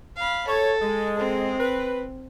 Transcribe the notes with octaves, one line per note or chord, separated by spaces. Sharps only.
F5 B5
A4 C#5
G#3
C4
B4